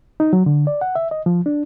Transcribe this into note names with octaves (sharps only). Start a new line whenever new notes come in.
D#4
F#3
D3
D5
F#5
E5
D#5
F3
D4